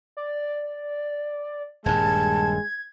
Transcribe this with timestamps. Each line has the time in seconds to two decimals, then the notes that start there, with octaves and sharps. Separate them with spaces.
0.17 D5
1.86 D#1 G2 G#3 A5 G#6